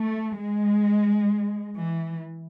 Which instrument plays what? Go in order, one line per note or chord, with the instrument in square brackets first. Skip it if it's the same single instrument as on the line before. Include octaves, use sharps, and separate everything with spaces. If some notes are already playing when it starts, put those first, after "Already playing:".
Already playing: [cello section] A3
G#3
E3